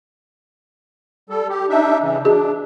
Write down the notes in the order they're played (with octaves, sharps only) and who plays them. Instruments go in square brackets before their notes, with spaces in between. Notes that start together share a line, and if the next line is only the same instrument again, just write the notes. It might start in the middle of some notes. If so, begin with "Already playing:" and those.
[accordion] G3 A4
G4
D4 D#4 E5
C#3 E3
[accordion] D4 [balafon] F#4 G#4 D#5